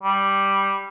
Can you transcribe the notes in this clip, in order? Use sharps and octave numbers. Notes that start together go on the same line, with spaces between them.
G3